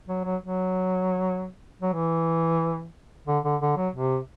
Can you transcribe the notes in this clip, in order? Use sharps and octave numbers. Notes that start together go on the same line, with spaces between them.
F#3
F#3
F#3
F#3
E3
D3
D3
D3
F#3
C3